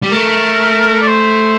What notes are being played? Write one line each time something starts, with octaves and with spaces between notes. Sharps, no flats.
G3
A3 A#4
D5
C5